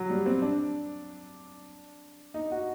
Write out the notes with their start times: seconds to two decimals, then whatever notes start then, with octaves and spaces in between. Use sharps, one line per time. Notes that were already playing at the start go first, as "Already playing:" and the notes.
Already playing: F#3
0.10 G3
0.26 C4
0.42 D4
2.34 D#4
2.52 F#4